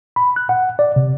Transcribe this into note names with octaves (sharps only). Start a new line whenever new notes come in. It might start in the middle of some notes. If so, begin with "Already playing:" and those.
B5
F#6
F#5
D5
C3